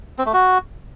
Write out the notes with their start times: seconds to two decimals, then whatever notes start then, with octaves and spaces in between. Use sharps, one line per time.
0.18 C4
0.26 A3
0.33 F#4